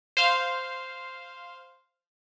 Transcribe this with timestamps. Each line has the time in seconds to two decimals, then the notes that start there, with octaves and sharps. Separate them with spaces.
0.17 C5 F5